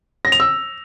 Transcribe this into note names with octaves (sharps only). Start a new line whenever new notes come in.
A#6
F7
E6